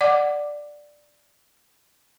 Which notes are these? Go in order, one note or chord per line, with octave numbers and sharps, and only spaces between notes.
D5 F#5 D6